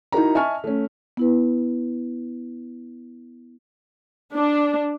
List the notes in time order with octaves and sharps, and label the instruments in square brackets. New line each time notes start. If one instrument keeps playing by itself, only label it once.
[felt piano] D#4 E4 F#4 A#4 A#5
D#5 E5 G#5 A5 C#6 F6
A3 C#4
[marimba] B3 E4 B4
[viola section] D4